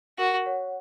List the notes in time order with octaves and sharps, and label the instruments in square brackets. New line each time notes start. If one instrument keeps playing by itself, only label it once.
[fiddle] F#4 [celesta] A#4
[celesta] C#5 F#5